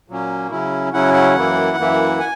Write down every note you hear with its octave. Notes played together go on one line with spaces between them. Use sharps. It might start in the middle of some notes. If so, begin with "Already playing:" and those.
A#2 F#3 A#3 C#4
C#3 F#3 C#4 E4
C#3 F#3 C#4 E4 F#5
F#5
F#2 E3 A#3 E4
F#2 E3 A#3 E4
G#5